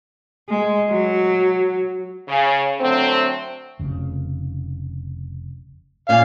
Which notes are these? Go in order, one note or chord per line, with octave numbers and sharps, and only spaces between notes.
G#3
F#3
C#3
D3 F#3 A3 C4
F1 C#3
A#2 C#4 F5